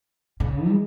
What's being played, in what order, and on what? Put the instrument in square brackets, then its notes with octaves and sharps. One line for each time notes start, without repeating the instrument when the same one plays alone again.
[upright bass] C#3
G#3